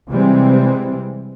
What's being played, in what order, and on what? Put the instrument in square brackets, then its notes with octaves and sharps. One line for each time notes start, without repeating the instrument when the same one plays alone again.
[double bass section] C3 E3 G3 G#3 C4